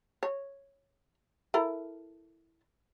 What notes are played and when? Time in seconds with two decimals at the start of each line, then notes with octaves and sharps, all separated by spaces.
0.23 C#5
1.54 E4 A4 A#4